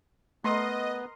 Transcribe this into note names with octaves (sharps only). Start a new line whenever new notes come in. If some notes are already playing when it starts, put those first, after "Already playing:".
A3 B3 A#4 D#5 C6